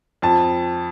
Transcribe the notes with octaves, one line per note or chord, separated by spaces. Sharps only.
F2 A5